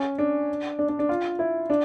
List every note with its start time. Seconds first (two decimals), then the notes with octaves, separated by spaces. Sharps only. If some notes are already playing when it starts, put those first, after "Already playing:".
Already playing: C#4
0.18 D4
0.79 D4
0.89 D4
0.99 D4
1.09 F4
1.39 E4
1.70 D4